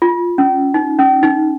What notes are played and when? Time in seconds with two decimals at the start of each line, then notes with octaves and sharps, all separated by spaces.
0.02 F4
0.38 C#4
0.74 D#4
0.99 C#4
1.23 D#4